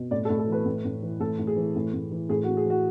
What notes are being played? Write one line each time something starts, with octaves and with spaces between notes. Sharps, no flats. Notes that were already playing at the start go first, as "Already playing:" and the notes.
Already playing: B2
A2 D5
A4
A2
A4
E3 B4
A2
A2
E3
A2 A4
A2
G#4
E3
A2
A2
E3
A2 G#4
F#4
A2
G#4
E3 F#4